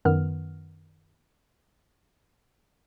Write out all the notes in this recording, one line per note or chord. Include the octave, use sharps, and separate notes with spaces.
F#2 D#3 B3 F6